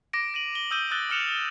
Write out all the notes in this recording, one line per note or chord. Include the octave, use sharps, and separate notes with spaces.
D6 A#6 D7
A#6 D#7 F#7
G7
D#6 E6 G6 D#7 G7
D#6 E6 F#6 A6 G7
D#6 F6 C#7 E7 F7